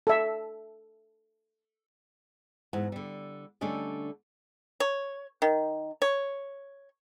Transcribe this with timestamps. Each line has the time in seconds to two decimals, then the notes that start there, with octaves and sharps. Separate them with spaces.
0.07 A4 E5
2.73 E2 G#2 F#5
2.92 D3 G3
3.61 D3 G3 A3 C#4 D4 D#5
4.80 C#5
5.42 D#3
6.02 C#5